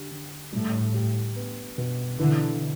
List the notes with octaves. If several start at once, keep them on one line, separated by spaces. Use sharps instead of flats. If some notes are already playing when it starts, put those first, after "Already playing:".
Already playing: D3 G4
D3
A2 G3
G4
B3
B2
D3 E3